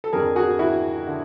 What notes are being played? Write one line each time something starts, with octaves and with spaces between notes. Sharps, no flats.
A4
F2 D3 F3 G#4 A#4
F#4 G#4
E4 F#4
D3